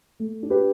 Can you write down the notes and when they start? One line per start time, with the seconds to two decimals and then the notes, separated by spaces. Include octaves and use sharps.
0.20 A3
0.43 D4
0.50 G4 B4